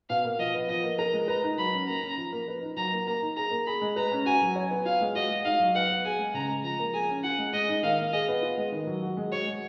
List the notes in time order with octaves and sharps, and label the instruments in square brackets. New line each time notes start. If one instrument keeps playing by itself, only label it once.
[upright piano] B2 [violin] F5
[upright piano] A#3
[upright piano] F3 [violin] D#5
[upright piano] B3
[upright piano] F3 [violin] D#5
[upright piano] A#3
[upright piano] A#4 [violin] A#5
[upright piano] G#3
[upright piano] B4 [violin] A#5
[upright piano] D#4
[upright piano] F#3 [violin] B5
[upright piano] C#4
[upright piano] A#3 [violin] A#5
[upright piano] C#4
F3
A#3
B4
D#4
[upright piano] F#3 [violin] A#5
[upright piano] A#3
[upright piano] A#3 [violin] A#5
[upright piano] D#4
[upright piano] G#4 [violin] A#5
[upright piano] A#3
[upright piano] G#4 [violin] B5
[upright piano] G#3
[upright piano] B4 [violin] A#5
[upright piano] C#4
[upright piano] F#4 [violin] G#5
[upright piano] F#3
C#5
B3
[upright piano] F4 [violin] F5
[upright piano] G#3
[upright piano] F#4 [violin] D#5
[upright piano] G#3
[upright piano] D#4 [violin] F5
[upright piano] F#3
[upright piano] B4 [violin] F#5
[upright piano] B3
[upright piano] G#4 [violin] G#5
[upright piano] G#3
[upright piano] C#3 [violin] A#5
[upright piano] G#3
[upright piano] F3 [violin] A#5
[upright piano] A#3
[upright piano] G#4 [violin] G#5
[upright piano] C#4
[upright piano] F4 [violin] F#5
[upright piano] G#3
[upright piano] G#3 [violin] D#5
[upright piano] D#4
[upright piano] D#3 [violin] F5
[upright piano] A#3
[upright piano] G#4 [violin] D#5
[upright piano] B3
F4
G#3
D#3
F#3
F#4
G#3
[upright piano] F#4 [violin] C#5
[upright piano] G#3